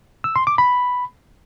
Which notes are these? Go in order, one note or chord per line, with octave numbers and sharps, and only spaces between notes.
E6
C6
D6
B5